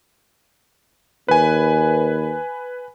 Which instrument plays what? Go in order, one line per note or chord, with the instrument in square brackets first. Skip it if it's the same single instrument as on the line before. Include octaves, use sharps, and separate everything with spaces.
[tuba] D#2 [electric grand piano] B4 G#5